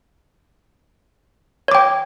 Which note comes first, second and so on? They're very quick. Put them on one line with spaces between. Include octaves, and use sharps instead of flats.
C#5 D6 G5